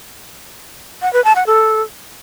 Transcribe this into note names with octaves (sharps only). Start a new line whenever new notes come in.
F#5
B4
A5
F#5
A4